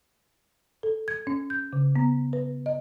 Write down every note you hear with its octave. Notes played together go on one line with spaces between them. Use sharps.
A4
G#6
C#4
G6
C#3
B3
B4
D#5